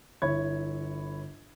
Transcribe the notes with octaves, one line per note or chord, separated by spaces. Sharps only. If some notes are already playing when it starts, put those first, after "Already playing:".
G1 E4 C#5 B5 G#6